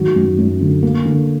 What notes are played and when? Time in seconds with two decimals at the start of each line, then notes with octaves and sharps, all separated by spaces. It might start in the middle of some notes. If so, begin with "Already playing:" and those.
Already playing: G#2 D#3 F#3 F#4
0.16 F#2
0.38 F#2
0.61 D3
0.83 A#3
1.05 D3